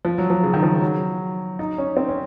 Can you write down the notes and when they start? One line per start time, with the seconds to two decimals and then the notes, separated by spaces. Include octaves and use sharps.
0.05 F3
0.18 F#3
0.30 F3
0.43 C#3
0.54 D#3
0.63 F3
0.82 F#3
1.59 D#4
1.78 C#4
1.97 C4
2.09 C#4